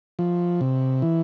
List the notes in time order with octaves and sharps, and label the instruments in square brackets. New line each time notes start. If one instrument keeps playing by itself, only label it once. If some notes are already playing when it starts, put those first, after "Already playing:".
[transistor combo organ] F3
C3
E3